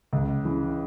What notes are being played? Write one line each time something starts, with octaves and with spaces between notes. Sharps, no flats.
C#2
C#3 E3